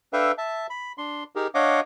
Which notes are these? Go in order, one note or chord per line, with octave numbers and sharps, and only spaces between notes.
D4 A4 B4 E5 F5 G5
E5 A5
B5
D4 C6
D#4 G4 G#4 A#4
D4 C#5 D#5 F5 F#5 D6